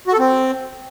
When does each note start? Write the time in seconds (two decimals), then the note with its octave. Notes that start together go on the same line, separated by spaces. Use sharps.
0.08 F#4
0.13 A4
0.19 C4